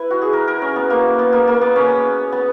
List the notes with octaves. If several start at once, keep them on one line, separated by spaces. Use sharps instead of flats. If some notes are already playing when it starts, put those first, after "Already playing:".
Already playing: E4 B4
F#4
G#4
A#4
A#4
C#4
B3
A#3
B3
A#3
A#3
B3
C#4
B3